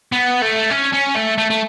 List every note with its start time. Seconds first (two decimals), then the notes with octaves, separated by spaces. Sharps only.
0.12 B3
0.42 A3
0.71 C#4
0.93 C#4
1.16 A3
1.38 A3
1.50 A3